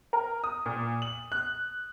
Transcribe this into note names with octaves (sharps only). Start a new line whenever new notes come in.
A#4
D#6
A#2
F#7
F#6